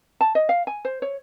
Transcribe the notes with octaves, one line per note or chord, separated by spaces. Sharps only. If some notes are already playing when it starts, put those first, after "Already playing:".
A5
D#5
F5
G#5
C5
C#5